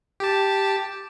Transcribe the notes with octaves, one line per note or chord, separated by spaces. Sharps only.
G4 A5